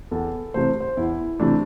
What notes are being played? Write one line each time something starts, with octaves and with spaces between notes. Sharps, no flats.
E2 A4
C3 E3 A3 C5
C5
E2 E4
C3 E3 A3 D4